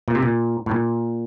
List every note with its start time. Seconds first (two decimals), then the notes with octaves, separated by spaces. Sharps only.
0.08 A#2
0.15 C3
0.23 A#2
0.66 A2
0.71 A#2